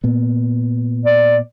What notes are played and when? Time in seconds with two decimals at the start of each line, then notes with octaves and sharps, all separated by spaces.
0.04 A#2 B3
1.05 D5